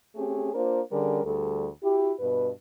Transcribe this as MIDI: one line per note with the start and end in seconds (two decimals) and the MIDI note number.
0.16 0.51 57
0.16 0.51 60
0.16 0.51 61
0.16 0.51 67
0.16 0.51 68
0.54 0.80 58
0.54 0.80 62
0.54 0.80 65
0.54 0.80 70
0.54 0.80 72
0.91 1.22 50
0.91 1.22 55
0.91 1.22 61
0.91 1.22 68
0.91 1.22 70
1.24 1.67 38
1.24 1.67 55
1.24 1.67 68
1.24 1.67 69
1.82 2.12 64
1.82 2.12 66
1.82 2.12 67
2.20 2.50 43
2.20 2.50 47
2.20 2.50 71